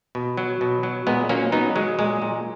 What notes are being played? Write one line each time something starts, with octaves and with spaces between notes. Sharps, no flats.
B2
F#3
B2
F#3
A#2 G#3 B3
F#3 A#3 C#4
F#3 B3 D#4
F#3 G#3
A#2 G#3
A#2